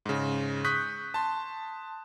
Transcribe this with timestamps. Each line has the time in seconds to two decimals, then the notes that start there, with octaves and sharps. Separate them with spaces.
0.06 G#2 C#3
0.64 C#6 D#6 F#6 G6 B6
1.14 A5 C6